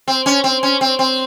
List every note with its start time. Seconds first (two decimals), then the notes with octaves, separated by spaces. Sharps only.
0.08 C4
0.26 C#4
0.44 C4
0.63 C#4
0.81 C4
0.99 C4